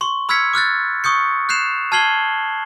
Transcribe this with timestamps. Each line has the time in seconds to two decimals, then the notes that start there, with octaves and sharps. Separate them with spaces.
0.01 C6 C#6
0.29 B5 E6 F6 G#6 B6 C#7
0.53 D6 F6 F#6 A6
1.04 C#6 D#6 G6 C#7
1.49 F#6 G6 C7 E7 F7
1.92 A5 F6 G#6 C7 F#7 G7